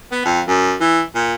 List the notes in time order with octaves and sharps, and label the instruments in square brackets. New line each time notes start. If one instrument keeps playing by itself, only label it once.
[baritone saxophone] B3
F2
F#2
E3
A#2